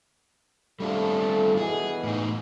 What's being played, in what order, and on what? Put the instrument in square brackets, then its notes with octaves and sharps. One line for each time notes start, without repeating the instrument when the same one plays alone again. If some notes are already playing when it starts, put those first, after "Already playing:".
[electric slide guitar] G3 D4 F4 [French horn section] A3 C4 A4
[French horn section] B2 E3 [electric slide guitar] G#4
[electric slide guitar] A2 D#4